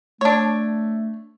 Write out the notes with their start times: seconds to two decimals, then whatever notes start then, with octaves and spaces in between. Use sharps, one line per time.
0.21 A3 D4 C#5